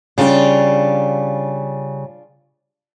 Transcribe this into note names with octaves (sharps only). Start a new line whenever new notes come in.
C#3 G3 D4 F4